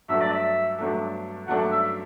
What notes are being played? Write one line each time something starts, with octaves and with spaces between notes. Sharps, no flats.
G2 F#3 A3 D4 A4 E5
D5
E5
G2 F#3 A3 D4 A4
G2 F#3 A3 D4 A4 F#5
E5